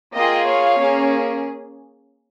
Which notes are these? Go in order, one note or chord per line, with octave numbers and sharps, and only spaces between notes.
A#3 F4 G#4 D#5 G5
C#5 F5
A#3 C#4 G#4